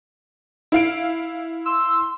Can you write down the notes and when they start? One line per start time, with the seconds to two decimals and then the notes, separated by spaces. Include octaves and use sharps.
0.72 E4 F5 D7
1.66 C6 E6